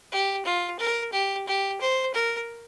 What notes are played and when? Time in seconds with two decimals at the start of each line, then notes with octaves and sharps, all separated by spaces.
0.12 G4
0.46 F4
0.79 A#4
1.13 G4
1.47 G4
1.81 C5
2.14 A#4